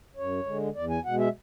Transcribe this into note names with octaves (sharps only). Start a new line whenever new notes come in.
F#2 C#5
D3 G#3
E2 D5
G#5
B2 G#3 F#5
E5